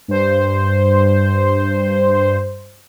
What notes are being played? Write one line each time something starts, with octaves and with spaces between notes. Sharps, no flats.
G2 C5